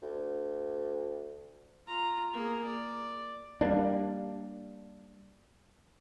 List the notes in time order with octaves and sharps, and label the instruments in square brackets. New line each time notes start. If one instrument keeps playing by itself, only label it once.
[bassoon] D2
[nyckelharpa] F4 A#5
A#3 G#4
D5
[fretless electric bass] G3 A3 A#3 D4